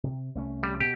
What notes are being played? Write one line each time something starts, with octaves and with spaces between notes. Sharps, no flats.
C3
C2 A3 C#4
G3
B2 G4